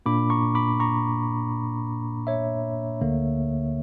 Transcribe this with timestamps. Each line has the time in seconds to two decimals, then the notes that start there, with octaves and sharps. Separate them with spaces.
0.06 A#2 A#3 D4 B5 D6
0.30 A#5 C#6
0.55 B5 D6
0.80 A#5 C#6
2.27 C#5 E5
3.01 D2 D3 A#3